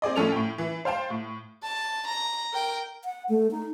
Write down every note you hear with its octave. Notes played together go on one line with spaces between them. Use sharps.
C4 G#4 D5 D#5
A2 F3 C#4 A4 F7
A2 G5
E3
C5 F5 G5 A5
A2
A5
A#5
A#4 G5
F#5
A3
D#4